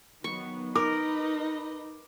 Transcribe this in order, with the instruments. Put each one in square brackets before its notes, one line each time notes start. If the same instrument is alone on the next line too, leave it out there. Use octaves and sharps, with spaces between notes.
[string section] D#3 F#3 B3 [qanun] C#6
[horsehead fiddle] D#4 [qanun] A#4 [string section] B4 D#5 [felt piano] D6